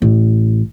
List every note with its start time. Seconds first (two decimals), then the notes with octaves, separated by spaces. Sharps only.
0.02 A1